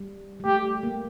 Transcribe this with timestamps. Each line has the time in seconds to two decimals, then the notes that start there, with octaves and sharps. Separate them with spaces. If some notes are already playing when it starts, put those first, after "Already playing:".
Already playing: G3
0.40 G3
0.45 A3 G4
0.83 A#3